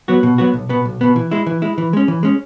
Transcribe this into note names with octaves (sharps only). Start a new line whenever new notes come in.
F#3 B3 F#4
B2
F#3 B3 F#4
B1
B2 B3
B1
B2 B3
E3
G#3 E4
E3
G#3 E4
E3
G#3 C#4
E3
G#3 C#4